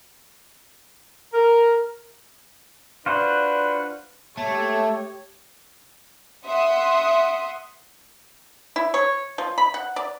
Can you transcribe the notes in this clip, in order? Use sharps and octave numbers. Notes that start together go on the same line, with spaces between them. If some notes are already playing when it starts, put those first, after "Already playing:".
A#4
D4 F4 F#4 B4 C5
A3 G4 C#5
E5 F#5 C6 D#6
E4
C#5
F3
B5
F#5
D5